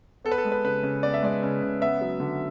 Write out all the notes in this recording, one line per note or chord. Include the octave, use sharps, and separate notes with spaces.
B3 A4
B4
A4
G#3
B4
C#3 B4
C#3
B3 D5
E5
G#3 D5
C#3
C#3
B3 E5
F#3
D3